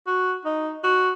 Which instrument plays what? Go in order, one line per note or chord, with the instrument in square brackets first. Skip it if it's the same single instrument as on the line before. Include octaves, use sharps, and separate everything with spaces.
[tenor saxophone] F#4
D#4
F#4